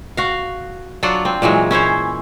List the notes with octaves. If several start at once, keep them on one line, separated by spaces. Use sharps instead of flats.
F#4 F5
F#3 D4 F4 F#5
C4
A#2 E3 F#3 G#3
C#4 E4 C5 C#5